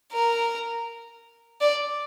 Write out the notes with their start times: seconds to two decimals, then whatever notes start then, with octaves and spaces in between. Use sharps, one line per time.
0.13 A#4
1.61 D5